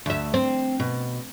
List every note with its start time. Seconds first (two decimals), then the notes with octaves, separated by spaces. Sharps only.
0.06 D2 E5
0.34 C4
0.80 B2